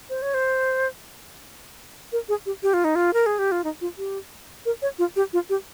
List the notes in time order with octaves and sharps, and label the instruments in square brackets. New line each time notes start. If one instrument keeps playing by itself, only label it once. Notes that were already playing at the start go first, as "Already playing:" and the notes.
[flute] C5
C#5
C5
A#4
G#4
G4
G4
F4
D#4
F4
A#4
G#4
G4
F4
D#4
F4
G4
A#4
C#5
F4
G4
F4
G4